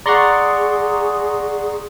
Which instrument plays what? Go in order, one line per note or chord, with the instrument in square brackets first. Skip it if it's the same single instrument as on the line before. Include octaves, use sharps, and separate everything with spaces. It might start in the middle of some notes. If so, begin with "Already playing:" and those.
[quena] G#4 [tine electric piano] D5 F#5 [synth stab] A#5 C6 C#6